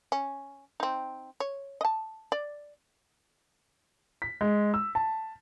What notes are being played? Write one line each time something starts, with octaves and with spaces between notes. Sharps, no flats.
C#4
C4 D#4
C#5
D#5 A5
D5
B6
G#3
E6
A5